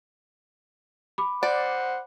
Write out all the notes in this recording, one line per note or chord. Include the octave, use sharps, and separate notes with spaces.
B5 D6
C5 D5 F#5